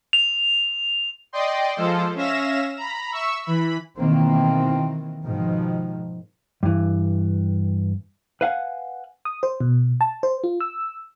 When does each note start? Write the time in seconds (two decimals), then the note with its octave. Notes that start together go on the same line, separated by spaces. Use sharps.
0.13 F7
1.33 D5 D#5 G5 C6
1.77 F3 G#3 F4 A4 C5
2.15 C#4 E5 F5 A#6 E7
2.76 A#5 B5
3.12 E5 C#6 E6
3.46 E3 B5
3.97 B2 D#3 E3 A#3 C4
5.25 G#2 B2 D#3 F3
6.63 G2 E3
8.41 B4 F5 F#5 G#5
9.25 D#6
9.43 C5
9.60 B2
10.01 A5
10.23 C5
10.44 F4
10.61 E6